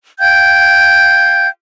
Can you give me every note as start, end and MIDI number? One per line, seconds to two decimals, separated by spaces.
0.19 1.47 77
0.19 1.47 79
0.19 1.47 91
0.19 1.47 92